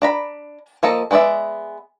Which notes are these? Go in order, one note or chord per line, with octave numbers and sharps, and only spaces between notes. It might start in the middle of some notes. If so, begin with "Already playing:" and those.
D4 A#5 B5
F3 A#3 A4 D#5
G#3 B3 F#4 D5 E5